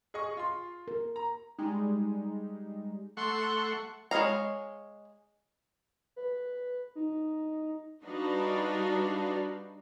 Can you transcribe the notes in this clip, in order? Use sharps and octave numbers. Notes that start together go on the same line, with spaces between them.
G#4 D#5 C#6
F4 C6
A#4
A#5
G3 G#3 D#4
A3 F#5 C6 C#6
G#3 C#5 D#5 F5 A#5
B4
D#4
G3 D4 D#4 F#4 B4 F5